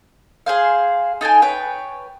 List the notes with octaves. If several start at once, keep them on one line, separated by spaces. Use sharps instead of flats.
G#4 C5 F5
D#4 A4 G5 G#5
B4 C#5 G5